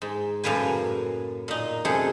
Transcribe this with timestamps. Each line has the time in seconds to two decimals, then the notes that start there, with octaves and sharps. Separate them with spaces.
0.02 G#2
0.44 F#2 A2 C#3 A#3 B4 G#5
1.48 A#2 D#4
1.85 F#2 C3 A3 G#4 F#5